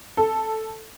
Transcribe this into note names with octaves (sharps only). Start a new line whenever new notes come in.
A4